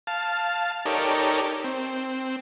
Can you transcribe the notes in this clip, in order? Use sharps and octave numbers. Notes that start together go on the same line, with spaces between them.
F5 A5
D#4 G4 A4 A#4 C#5 D5
C4